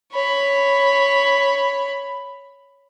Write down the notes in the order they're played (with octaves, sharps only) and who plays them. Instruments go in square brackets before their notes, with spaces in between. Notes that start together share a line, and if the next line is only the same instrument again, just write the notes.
[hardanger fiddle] C#5 B5